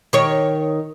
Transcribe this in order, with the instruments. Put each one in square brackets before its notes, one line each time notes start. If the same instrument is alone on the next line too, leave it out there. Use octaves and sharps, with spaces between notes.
[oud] D#3 C#5